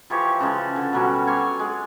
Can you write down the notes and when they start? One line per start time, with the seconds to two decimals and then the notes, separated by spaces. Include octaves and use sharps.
0.10 E3 F3 G4 C#5
0.40 C#3 G#3 A5
0.76 D3
0.93 B2 F#3 G3 C#4
1.27 C#5 D5 G#5 C6
1.59 G#3